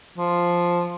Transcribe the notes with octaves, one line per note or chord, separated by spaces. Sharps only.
F3